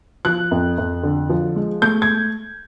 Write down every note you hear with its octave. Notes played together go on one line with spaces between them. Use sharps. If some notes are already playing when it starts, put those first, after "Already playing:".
F3 F#6
F2
F2
D3
F3
G#3
A3 G6
G#6